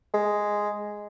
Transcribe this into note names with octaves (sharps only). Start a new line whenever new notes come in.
G#3